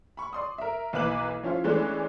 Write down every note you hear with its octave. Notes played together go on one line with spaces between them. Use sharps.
B5 C#6
D5 C6 D#6
A#4 E5
B1 E3 A#3 B4 D6 F#7
F3 C#4 E4 F4
E3 G#3 A3 B3 C#4 D4